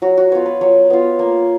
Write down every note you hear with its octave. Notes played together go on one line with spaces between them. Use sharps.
F#3 F#4
F#4
B3 F4 C#5
B4
F#3 C#5
B3 F4
A#3